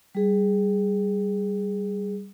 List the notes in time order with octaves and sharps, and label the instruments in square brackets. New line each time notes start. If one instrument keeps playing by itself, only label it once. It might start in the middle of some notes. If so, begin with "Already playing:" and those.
[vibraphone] G3 G#4